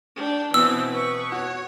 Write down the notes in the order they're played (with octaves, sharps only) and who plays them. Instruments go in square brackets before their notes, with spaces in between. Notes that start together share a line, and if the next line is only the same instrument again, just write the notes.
[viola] D4 G5
[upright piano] B2 [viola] E3 C4 [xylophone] E6
[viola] B4 C#6
[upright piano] F#4 [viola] C#5